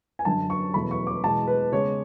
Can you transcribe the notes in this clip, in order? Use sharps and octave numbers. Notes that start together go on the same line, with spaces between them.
G#5
F#2 D3 F#3 A5
C#6
E2 B2 F#3 A3 B5
C#6
D6
E2 B2 G#3 B3 A5
B4
C#3 G#3 B3 C#5